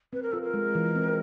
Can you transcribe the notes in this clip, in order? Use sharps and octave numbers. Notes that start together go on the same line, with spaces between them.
C4 B4
A#4
F4 A4
A#4
G#3
E3
C4